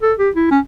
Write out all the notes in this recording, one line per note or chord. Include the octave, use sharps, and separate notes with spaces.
A4
G4
E4
C#4